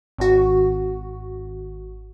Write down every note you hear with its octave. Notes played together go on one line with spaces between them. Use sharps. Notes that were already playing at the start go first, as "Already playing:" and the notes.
G#1 F#4